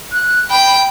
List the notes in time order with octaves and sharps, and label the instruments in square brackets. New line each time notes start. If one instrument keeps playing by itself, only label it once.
[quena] F#6
[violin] G5 [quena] B5